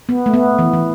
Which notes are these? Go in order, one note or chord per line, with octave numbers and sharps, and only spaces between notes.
B3
A3
B3
E3
E3